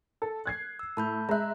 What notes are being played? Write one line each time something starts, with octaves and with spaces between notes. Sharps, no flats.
A4
F#6 G#6 C7
E6
A2 A5 B5 G6
G#3 E5 A#5 F#6